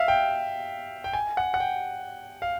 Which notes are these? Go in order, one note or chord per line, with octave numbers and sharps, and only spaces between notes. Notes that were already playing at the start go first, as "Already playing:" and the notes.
Already playing: E5 F5
G5
G5
G#5
F#5
F#5
G5
F5